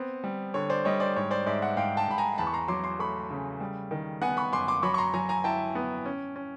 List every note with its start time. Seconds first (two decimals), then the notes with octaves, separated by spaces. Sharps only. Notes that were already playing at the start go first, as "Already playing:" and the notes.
Already playing: B3 C4
0.24 G3
0.54 D3 C#5
0.70 C5 D5
0.85 G3 C#5 D#5
1.00 C5 D5
1.16 G#2 C#5
1.31 C5 D5
1.46 G#2 D5 E5
1.62 E5 F#5
1.77 G#2 F5 G5
1.97 G5 A5
2.08 G#2 B5
2.18 G#5 A#5
2.38 E2 A5 B5
2.47 C#6
2.53 A#5 C6
2.68 F#3 C6 D6
2.84 C6 D6
2.99 A3 B5 C#6
3.31 C#3
3.60 G3
3.91 D#3
4.22 B3 F#5 G#5
4.37 B5 C#6
4.53 F#2 C6 D6
4.68 C6 D6
4.83 F#3 B5 C#6
4.94 C#6
4.98 A#5 C6
5.14 F#3 G#5 A#5
5.29 G#5 A#5
5.44 E4 G5 A5
5.75 B3
6.05 C#4
6.36 C#4